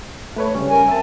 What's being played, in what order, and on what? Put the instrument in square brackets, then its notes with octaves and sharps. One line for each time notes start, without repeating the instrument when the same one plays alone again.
[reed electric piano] A3 B4 C#5
C#3 G3 C#4
[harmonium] A#4 G#5
[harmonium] C4 [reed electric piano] E5 A5